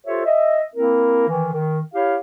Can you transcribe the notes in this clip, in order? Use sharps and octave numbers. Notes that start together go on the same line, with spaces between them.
F4 G4 A4 C5 C#5 E5
D#5 E5
A#3 C4 E4 A#4
D#3 E3
D#3
E4 G4 C#5 F5